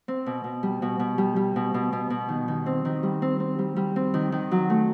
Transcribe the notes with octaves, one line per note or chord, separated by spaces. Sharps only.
C4
B2
B2
G3
B2
B2
G3
G3
B2
B2
B2
B2
D#3
D#3
C4
D#3
G3
C4
C4
G3
G3
C4
D#3
D#3
F#3
A3